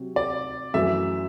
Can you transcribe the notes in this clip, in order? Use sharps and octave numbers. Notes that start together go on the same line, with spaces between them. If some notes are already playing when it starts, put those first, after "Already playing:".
Already playing: C3 F#3
D5
F#2 E3 A3 E4 E5